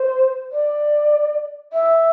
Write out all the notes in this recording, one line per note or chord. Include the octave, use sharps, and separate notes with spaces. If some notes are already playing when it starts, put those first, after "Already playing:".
Already playing: C5
D5
E5